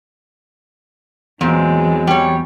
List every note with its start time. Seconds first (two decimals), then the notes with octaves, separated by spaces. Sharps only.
1.41 E2 A#2 E3 F#3 G#3 C4
2.07 G3 C#5